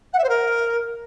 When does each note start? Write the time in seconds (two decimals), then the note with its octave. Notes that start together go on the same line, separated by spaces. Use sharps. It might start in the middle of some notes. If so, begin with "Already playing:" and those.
0.13 F#5
0.18 E5
0.23 C5
0.29 A#4